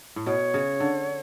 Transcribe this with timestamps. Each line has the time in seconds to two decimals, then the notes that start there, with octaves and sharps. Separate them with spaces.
0.16 A2
0.26 B2 C#5
0.54 C#3
0.80 D3